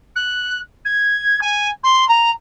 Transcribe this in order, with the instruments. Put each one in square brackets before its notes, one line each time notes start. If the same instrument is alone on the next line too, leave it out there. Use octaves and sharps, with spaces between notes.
[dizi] F#6
G#6
G#5
C6
A#5